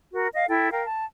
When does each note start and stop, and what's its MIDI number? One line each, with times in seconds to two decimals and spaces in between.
0.14 0.28 66
0.14 0.28 70
0.34 0.44 75
0.34 0.44 77
0.48 0.69 64
0.48 0.69 69
0.48 0.69 79
0.71 0.84 70
0.71 0.84 77
0.71 0.84 79
0.84 1.04 81